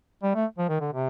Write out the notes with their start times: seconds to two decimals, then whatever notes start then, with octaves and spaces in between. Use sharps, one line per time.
0.23 G3
0.35 A3
0.58 F3
0.69 D#3
0.81 D3
0.93 C3